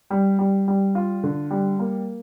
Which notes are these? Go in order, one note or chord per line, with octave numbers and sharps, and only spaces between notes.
G3
G3
G3
F4
D3
G3
A#3